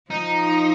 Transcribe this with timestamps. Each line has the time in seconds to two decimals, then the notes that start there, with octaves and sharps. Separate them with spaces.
0.11 F3 D#4